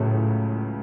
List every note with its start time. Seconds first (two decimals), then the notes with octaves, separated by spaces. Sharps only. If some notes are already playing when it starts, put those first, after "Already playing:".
Already playing: C#2 A2 C#3 F#3 A3